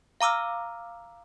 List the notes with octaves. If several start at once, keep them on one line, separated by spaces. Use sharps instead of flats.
F5 A#5 D6 E6 F6